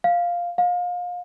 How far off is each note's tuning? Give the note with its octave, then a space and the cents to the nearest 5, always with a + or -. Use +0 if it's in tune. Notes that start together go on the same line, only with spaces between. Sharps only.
F5 +0
F5 +30